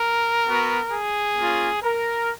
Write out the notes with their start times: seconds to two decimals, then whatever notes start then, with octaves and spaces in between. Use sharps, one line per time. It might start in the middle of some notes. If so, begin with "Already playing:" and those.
Already playing: A#4
0.46 B3 F#4
0.91 G#4
1.37 A#3 C#4 F4
1.83 A#4